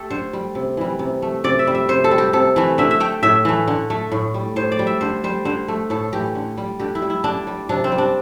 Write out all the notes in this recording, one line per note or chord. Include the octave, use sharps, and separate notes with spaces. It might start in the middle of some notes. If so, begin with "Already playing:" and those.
Already playing: A3 G4 A4
D3 C5
G3
C3
E3 G3
C3
A3
C3 D5
E5
G3
E5
C3 C5
A4
G3
G4
C3 A4
E3 A3
D3 E5
E5
A3 G5
A2 E5
E3 A3
D3
A3
A2
G3
A2 C5
D5
G3
E5
D3 C5
G3 C5
D3 C5
A3
A2 A4
E3 A3 G4
D3
G3
D3 G4
E4
G3
E4
D3 D4
G3
C3 D4
C4
G3
D4